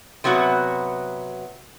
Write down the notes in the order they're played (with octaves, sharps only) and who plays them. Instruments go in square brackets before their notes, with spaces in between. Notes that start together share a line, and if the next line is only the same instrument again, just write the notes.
[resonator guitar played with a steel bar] C3 F#3 B3 F#4